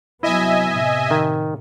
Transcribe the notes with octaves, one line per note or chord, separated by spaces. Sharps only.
C2 F#3 B3 E4 D#5 E5 G#5
A2 C3
D#3